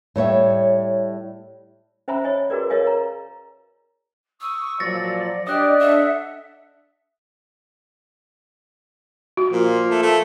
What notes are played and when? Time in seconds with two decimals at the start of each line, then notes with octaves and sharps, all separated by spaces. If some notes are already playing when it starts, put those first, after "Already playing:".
0.16 A2 G3 C#5 E5
2.08 C#4 C5 E5 G#5 A#5 B5
2.24 C#5 D#5 G#5
2.50 F#4 G#4 A#4 B4 D5
2.70 A#4 C#5 D#5 F5 G#5
2.87 A#5
4.41 C#6 D#6 E6
4.80 A#2 F3 F#3 D5 A6 A#6 C#7
5.47 D4 G4 D5 D#5 D#6 F#6
5.80 D4 A4 E5 F#5
9.37 F#4
9.52 A#2 F3 A#3
9.91 A3
10.03 A3